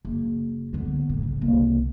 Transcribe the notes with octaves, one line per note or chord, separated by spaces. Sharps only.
F#1
D3 B3
A2
C#3
C2 A#3